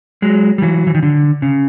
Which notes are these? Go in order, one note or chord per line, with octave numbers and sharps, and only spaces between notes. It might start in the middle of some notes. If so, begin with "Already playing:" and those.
F#3 G#3
G3
E3 F#3
E3
D#3
D3
C#3